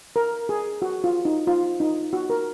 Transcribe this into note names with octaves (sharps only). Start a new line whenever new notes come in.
A#4
G#4
F#4
F4
D#4
F4
D#4
F#4
A#4